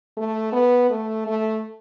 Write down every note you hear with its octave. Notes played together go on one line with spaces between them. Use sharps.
A3
B3
A3
A3